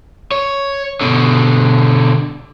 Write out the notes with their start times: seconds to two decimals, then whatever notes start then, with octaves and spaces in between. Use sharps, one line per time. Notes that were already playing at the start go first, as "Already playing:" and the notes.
0.31 C#5
1.01 B2 D3